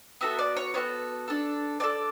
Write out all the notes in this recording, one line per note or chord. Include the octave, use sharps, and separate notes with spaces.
B3 F#4 A4 E5
D5
C#5
B3 F#4 A4 C#5
D4 A4
D4 A4 D5